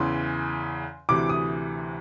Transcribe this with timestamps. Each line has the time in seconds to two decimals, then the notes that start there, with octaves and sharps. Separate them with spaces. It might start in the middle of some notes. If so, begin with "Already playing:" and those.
Already playing: E2 C#3 E3 C6
1.09 D2 C3 E3 D6
1.29 D#6